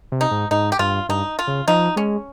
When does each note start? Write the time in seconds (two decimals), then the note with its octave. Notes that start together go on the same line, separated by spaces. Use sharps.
0.12 C3
0.21 D#4
0.31 G#2
0.51 G#2 D#4
0.72 G4
0.79 G2 F4
1.09 G2 D#4
1.39 F4
1.47 C#3
1.68 F3 D#4
1.96 G#3 C#4